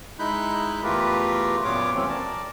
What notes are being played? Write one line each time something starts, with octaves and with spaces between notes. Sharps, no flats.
G#3 D#4 E4 B5 F#6 G6
E2 A3 F4 G4 A#4 B4
F#2 A#2 B3 F4 C#5 D6
C3 E3 F#3 A3 C4 C#4
A#4 D5 A5